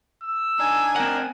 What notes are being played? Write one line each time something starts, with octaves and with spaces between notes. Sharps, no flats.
E6
D4 D#4 G#5
C4 A#4 F#5